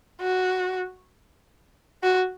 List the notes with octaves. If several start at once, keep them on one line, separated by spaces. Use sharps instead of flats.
F#4
F#4